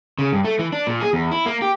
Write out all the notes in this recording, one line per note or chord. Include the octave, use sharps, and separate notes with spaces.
C#3
G2
A3
E3
D4
A#2
G#4
E2
E4
A#3
G4